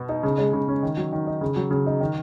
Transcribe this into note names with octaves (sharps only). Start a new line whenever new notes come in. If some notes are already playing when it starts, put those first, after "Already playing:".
Already playing: B2 B3
D#4
C#3
G#3
C#3
C#4
D#3
F#3
D#3
D#4
C#3
F#3
C#3
D#4
D#3